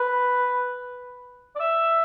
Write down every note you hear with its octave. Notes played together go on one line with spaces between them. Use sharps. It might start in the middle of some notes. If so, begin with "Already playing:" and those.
Already playing: B4
D5
E5